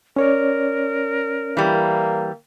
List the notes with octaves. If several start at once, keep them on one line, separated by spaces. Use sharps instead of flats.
C#4 A#4 C#5 D5
E3 G3 A#3